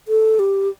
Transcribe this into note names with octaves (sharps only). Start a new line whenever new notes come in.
A4
G4